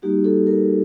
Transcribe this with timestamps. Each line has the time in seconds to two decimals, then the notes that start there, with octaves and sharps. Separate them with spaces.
0.02 G3 A#3 D#4 F#4 G4
0.24 A4
0.47 A#4